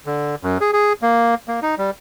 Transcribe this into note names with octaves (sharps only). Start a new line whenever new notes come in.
D3
F#2
G#4
G#4
A#3
A#3
D#4
G3